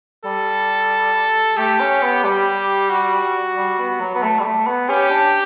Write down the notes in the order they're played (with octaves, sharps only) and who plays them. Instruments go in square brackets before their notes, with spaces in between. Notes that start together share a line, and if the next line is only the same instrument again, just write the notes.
[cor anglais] G3 [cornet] A4
[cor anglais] A3 [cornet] G4
[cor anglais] C#4
B3
[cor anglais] G3 [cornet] G4
[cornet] F#4
[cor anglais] G3
B3
F#3
B3
A3
G3
A3
B3
[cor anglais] C#4 [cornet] G4
[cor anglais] D4